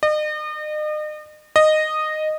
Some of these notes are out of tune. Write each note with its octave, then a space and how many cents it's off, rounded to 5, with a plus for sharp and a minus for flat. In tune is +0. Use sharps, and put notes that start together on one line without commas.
D#5 -40
D#5 -10